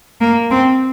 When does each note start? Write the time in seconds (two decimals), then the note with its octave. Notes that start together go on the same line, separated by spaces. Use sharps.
0.21 A#3
0.51 C4